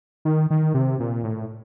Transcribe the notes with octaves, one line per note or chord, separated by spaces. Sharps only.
D#3
D#3
C3
A#2
A2